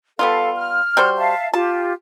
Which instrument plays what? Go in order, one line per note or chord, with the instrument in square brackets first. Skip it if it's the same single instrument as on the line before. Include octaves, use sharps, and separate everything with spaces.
[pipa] G3 B3 F4 [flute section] A4 F5
[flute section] F6
[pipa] G3 F#4 C5
[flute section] E5 F5 A5
[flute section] F4 G4 [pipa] A5